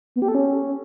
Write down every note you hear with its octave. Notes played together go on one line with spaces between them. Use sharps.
B3
G4
A4
C#4